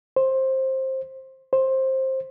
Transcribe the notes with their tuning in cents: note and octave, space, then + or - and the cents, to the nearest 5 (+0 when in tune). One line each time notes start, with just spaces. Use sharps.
C5 +15
C5 +15